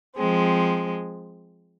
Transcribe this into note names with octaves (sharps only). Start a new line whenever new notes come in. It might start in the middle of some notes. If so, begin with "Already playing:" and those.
F3 G#3 C4